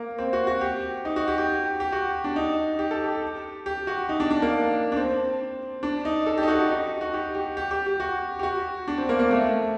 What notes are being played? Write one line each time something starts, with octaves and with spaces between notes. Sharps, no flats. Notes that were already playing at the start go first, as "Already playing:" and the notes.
Already playing: A#3
C4
F#4
F#4
G4
D#4
F#4
G4
G4
G4
F#4
D4
D#4
G4
A4
G4
G4
F#4
D#4
D4
D4
A#3
D4
C4
D4
D#4
A4
G4
D#4
F#4
F#4
D#4
F#4
G4
G4
G4
G4
G4
F#4
G4
F#4
D4
C4
A#3
A#3
A3